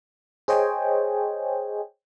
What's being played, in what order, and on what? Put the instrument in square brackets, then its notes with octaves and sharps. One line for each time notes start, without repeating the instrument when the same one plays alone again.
[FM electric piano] G#4 C5 C#5 D#5 G5 G#5